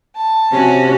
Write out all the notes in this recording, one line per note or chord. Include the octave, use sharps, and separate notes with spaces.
A5
C3 C#4 F#4